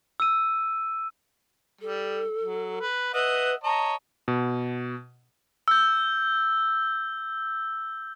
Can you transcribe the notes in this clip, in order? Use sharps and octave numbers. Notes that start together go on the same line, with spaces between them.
E6 D#7
G3 A4
F#3
B4
B4 D#5 E5 F#5
C#5 D#5 A5 A#5
B2
E6 G6